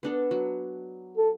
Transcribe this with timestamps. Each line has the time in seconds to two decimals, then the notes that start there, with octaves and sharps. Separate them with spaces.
0.03 B3 D4 A4
0.31 F#3
1.17 A4